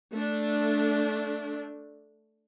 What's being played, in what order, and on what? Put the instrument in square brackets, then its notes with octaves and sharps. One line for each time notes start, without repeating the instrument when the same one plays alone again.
[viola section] A3 D4